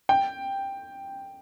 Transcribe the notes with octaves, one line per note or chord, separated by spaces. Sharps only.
G5